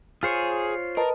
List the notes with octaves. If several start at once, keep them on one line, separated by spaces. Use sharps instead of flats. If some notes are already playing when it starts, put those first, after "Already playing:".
F4 G#4 C5 C#5
A#4 B4 D#5 A5